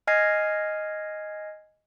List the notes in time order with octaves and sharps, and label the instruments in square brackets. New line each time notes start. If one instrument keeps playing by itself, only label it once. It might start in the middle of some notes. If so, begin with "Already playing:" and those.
[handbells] D#5 G#5 F6 G#6 A#6 C7